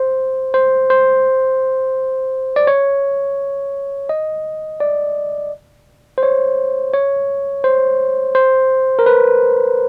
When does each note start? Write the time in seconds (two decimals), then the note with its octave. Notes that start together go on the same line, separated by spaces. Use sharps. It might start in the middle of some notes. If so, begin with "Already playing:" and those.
Already playing: C5
0.54 C5
0.90 C5
2.56 D5
2.67 C#5
4.09 D#5
4.81 D5
6.18 C5
6.23 C#5
6.94 C#5
7.64 C5
8.35 C5
8.99 A#4
9.06 B4